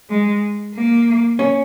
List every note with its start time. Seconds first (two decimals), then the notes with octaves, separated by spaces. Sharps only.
0.10 G#3
0.75 A#3
1.39 C#4